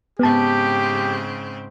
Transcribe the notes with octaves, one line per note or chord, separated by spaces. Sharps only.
G#2 C#3 B3 C4 G4 A5